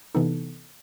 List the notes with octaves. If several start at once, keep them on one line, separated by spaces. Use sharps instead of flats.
C3 E3 B3 D#4 A4